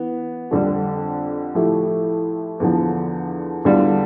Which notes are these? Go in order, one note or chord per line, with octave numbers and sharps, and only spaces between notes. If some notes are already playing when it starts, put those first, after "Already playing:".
Already playing: E3 B3
F2 D3 G3
A2 F3 A3 E4 G4
E2 D3 F3
E2 D3 G3 D4 F4